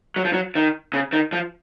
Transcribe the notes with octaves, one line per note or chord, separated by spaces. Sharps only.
F#3
F3
F#3
D#3
C#3
D#3
F3